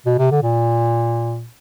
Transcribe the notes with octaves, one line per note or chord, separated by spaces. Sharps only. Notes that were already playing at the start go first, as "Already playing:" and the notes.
B2
C3
D3
A#2